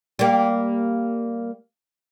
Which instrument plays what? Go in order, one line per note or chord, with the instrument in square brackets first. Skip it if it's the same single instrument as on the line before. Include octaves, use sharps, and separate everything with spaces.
[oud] G3 A#3